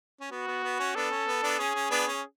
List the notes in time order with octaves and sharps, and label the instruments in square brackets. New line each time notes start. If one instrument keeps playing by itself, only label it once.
[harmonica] C#4
[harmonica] B3 [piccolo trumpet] F#4
[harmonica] B3
B3
C#4
[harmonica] B3 D4 [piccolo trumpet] A4
[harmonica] C#4
B3
B3 D4
[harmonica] C#4 [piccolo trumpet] G#4
[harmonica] C#4
B3 D4
C#4